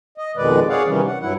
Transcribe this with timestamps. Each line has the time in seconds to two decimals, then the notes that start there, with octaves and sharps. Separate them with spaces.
0.18 D#5
0.37 F2 B2 D#3 G#3 B4 D5
0.69 G#4 C#5 D5 F5 F#5
0.87 C3 D#3 E3 G3 C#4
1.07 F#5
1.22 G2 F#3 E4 F#5